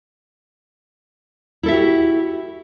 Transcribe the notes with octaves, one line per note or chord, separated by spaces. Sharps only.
E4 F#4 G4 A4 E5